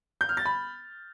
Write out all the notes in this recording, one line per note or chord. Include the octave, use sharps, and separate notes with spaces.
G6
F6
A6
B5